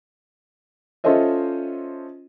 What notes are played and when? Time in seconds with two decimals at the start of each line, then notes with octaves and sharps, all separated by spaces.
1.04 C#4 F4 A4 C5 D#5 E5